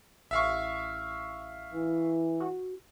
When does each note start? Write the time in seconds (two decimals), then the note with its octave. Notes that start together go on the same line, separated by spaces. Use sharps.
0.31 A1 E5 F5 C#6
1.74 E3
2.40 F#4